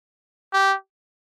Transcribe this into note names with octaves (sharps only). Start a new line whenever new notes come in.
G4